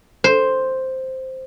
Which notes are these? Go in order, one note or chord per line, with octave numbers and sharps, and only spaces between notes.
C5